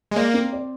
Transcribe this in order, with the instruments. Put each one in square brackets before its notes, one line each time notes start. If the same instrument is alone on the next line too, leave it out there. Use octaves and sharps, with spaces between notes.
[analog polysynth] G#3
[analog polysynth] A#3 [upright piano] D5
[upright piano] C4
D5